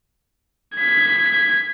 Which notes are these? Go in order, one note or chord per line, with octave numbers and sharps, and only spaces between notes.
G#6 B6